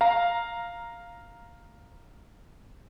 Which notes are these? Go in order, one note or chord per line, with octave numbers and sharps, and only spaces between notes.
F5 A#5